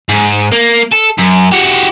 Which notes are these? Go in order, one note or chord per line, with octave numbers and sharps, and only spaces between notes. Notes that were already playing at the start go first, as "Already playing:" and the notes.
G#2
A#3
A4
F#2
F#4 G4